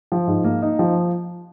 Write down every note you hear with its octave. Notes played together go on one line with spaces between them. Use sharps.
F3
G#2
A#3
D#4
F3